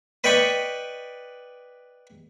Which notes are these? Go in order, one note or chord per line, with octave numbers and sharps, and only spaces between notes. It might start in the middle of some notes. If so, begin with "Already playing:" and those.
B4 D5 D#5 G5 B5 C#6